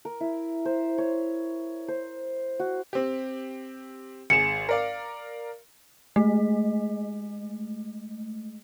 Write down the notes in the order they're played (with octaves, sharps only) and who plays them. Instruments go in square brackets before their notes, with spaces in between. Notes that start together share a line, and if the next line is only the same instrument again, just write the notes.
[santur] A#4
E4
C5
C#5
C5
F#4
[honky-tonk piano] C4 G4
[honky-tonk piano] G#1 G#4 E7 [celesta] C#7
[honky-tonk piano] A#4 D5 F5
[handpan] G#3 [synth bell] A3